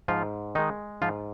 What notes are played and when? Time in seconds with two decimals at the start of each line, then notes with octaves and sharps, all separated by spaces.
0.08 G#2 F3 F4
0.55 D#3 G#3 D#4
1.02 G#2 F3 F4